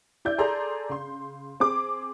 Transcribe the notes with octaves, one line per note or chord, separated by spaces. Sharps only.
E4 D5 E5 G6
G#4 A4 D5 A#5 C6
C#3 C6
C4 G#4 D6